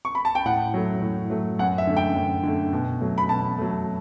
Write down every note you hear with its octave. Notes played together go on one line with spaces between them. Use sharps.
C#6
B5
A5
G5
A2 F#5
F#3 A3
A2
F#3 A3
F#2 F#5
E5
D3 A3
G5
F#2
D3 A3
B2
F#3 A3
B5
B2 A5
F#3 A3